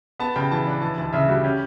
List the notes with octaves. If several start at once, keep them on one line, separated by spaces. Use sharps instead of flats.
B3 A5
C#3 G5
E3 A5
D4
E3 A5
D2 A5
C#3 E5
G3 F#4
C#4 G4